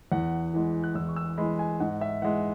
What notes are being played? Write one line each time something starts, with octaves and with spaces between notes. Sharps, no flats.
E2 F#5
E3 G#3
F#6
E2 E6
C#6
E6
E3 G#3 B5
G#5
G#2 F#5
E5
E3 G#3 F#5